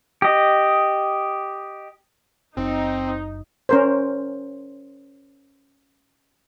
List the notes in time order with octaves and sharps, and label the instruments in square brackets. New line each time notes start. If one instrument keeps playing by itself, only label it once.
[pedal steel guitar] G4 D#5
[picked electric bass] F#1 [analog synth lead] C4 [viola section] D#4
[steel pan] C#4 A#4 C5